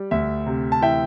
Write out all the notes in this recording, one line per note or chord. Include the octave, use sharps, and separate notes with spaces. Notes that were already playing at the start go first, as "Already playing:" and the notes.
Already playing: G3
D2 E5
C3
A5
E3 E5 G5